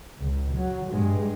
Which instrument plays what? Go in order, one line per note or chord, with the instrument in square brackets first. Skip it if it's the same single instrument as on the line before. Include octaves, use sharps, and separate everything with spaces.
[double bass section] C#2
F#3
G2 G#3